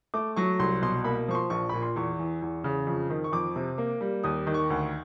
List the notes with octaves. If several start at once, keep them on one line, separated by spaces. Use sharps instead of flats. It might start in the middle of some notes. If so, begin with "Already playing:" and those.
A3 D6
F#3 C#6
C2 C6
B2 C6
A#3 B5
F3 C#6
C6
A#1 C#6
A#2 B5
C6
E2 C#6
E3
E2
C#3
F2
D#3
C#6
F2 D6
C3
A#3
G3
D#2 D#6
D#3
C#6
D2